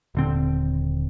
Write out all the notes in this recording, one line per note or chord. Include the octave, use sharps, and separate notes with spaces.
D#1 D3 C4